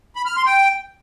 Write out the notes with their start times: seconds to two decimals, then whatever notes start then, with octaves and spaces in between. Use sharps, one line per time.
0.16 B5
0.26 F6
0.36 C6
0.46 G5